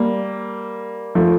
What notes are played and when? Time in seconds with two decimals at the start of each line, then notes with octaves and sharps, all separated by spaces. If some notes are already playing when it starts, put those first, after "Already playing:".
Already playing: G3 A#3
1.15 F3 A3